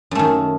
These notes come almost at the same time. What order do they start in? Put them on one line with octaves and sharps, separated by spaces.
F#2 A3 D#3